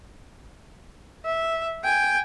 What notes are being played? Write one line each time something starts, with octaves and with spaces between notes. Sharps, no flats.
E5
G5 G#5